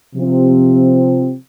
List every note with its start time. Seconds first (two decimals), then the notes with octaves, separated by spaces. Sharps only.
0.15 C3 F3 C4